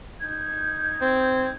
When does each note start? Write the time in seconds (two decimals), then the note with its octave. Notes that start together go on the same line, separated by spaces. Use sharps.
0.20 D#4 G6 G#6
1.01 C4